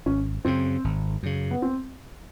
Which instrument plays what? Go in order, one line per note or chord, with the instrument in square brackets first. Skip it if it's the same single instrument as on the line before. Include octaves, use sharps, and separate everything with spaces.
[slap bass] G#1 [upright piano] C#4
[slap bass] F#2 C#3 [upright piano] C4
[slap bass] G#1
F#2 C#3
[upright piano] B3
C4